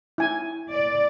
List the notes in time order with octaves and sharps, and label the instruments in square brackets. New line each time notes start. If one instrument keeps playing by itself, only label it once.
[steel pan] E4 G#5
[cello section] D5